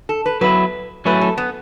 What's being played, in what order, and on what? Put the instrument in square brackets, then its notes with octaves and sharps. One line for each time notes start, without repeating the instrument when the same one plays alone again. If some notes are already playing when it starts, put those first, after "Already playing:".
[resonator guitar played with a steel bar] A4
B4
[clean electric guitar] F#3 B3 E4 [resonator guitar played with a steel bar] B4
[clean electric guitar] F#3 A3 C#4 E4 [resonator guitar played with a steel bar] B4
[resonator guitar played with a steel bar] A4
B3